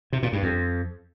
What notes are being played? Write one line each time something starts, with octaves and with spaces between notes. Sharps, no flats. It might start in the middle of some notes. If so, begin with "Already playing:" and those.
C3
A#2
G2
F2